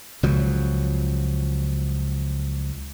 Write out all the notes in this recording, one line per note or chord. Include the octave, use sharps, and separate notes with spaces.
C#2 C#3 F3 F#3